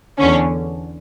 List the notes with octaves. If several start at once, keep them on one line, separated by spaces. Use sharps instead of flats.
E2 D3 C#4